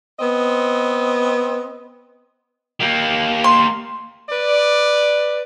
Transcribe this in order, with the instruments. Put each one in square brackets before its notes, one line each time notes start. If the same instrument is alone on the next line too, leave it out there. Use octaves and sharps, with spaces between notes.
[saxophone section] B3 C4 D#5
[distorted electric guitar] A#3 G4
[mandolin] C6
[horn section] B4 D5